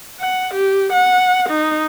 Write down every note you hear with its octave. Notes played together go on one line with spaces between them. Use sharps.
F#5
G4
F#5
D#4